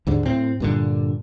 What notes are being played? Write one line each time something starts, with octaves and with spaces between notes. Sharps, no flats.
D#2 G#2 D3
A2 C4
G2 A#2 D3